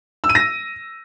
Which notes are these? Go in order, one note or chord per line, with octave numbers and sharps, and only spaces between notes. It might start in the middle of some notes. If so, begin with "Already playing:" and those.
E6
D#7
A#6